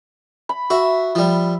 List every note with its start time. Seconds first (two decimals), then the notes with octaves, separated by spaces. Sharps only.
0.49 B5
0.70 F#4 E5
1.15 F3 G3